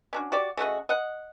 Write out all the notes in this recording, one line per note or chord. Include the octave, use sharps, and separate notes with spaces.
C#4 D4 F#4
F#4 G4 D5
C#3 A3 F#4 D#5
D#5 F#5